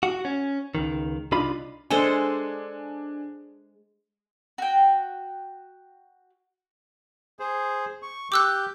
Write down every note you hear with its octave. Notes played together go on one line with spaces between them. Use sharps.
F#4
C#4
C#2 D#3
C2 D4 D#4 F4 B5
G#3 D4 A4 C5 G#5
F#4 G5
G#4 C5
C#6
G4 D6 E6 F#6 G6